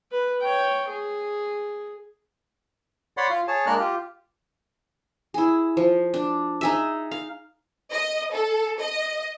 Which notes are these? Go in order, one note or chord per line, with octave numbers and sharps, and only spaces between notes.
B4
C#5 G5
G#4
C#5 D5 F#5 B5 C6
F4 F5
G#4 C#5 A5
G#3 A#3 D4 A#4 F6 F#6
F4 G4
E4 G#4
F3
D4
D#4 G#4 E5
F5
D#5
A4
D#5